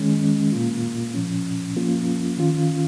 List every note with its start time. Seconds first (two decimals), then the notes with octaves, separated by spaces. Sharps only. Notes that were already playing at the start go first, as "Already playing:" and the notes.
Already playing: D#3 G#3 C#4
0.52 A#2 A#3 F4
1.14 A#2 F3 C#4
1.76 F3 A#3 C#4 F4
2.38 D#3 C#4 F4